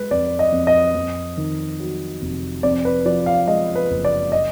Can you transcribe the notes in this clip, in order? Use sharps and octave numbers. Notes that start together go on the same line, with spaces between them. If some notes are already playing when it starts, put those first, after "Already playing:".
Already playing: G#3 B4
F2 D5
D#5
F2
D#5
F2
D#3
F#3
F1
F2 D5
B4
F3 D5
F5
G#3 D#5
B4
F#1
D5
D#5